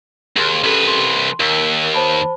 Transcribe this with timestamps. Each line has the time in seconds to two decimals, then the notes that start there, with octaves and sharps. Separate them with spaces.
0.36 D#2 G#4 C6
0.63 C2 C#4 G4 A4 B4
0.88 C6
1.40 D#2 A#4 E6 B6
1.94 C5 A5 B5